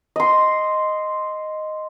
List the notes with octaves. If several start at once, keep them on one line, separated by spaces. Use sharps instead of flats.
D#5 C6